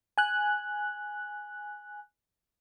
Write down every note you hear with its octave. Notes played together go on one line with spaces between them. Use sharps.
G#5 F#6